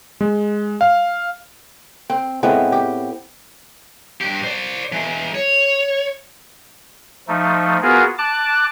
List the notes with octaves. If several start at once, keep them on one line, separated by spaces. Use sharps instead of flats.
G#3
F5
C4
A2 G#3 B3 C4
G4
G2 G4
C5 D5
E3 G#3
C#5
F3 A3 D#4
B3 F4 F#4 G#4 A#4
A5 D6 F#6